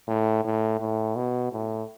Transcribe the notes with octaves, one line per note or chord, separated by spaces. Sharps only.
A2
A2
A2
B2
A2